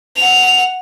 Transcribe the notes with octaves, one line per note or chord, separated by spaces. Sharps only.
F#5 F7